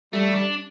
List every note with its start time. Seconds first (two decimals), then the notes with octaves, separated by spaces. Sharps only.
0.13 G3 A3
0.34 D4